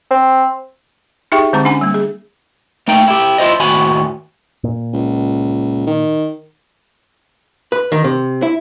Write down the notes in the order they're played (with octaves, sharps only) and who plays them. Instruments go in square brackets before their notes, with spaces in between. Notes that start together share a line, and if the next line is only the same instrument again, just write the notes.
[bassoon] C4
[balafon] D#4 G4 G#4 E5 G5 C#6
D3 G#3 C4 A#5 D6
C#4 D4 F#5 G#5
G3 A#3
G#4
[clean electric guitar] A3 A#3 D#4 G5
E4 G4
E4 F4 C5 D#5
D#2 A2 F#4 G#5 B5
[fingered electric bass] A#2
[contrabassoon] C#2
D#3
[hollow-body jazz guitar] B4
D#3
C3
E4